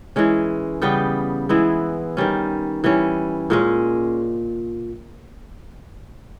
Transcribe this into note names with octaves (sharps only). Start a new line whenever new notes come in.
E3 G#3 C#4
C#3 G3 B3 G4
E3 G#3 B3 E4
D#3 G3 C#4
E3 G3 C#4
A#2 G#3 C#4